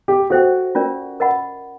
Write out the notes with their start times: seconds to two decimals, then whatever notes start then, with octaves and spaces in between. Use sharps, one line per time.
0.08 G4
0.30 F#4 A4 C5 E5 G5
0.75 C#4 F4 A#4 D5
1.20 A#4 D#5 F#5 B5